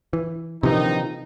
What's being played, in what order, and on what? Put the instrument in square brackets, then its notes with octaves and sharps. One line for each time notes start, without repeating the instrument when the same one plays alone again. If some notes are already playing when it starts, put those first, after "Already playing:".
[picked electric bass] E3
[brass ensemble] A#1 D#3 D#4 [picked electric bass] C3 E3